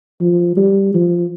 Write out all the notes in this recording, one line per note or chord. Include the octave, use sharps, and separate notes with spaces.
F3
G3
F3